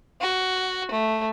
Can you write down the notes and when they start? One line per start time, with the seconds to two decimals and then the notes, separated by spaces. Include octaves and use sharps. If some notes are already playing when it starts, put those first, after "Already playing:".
0.21 F#4
0.91 A3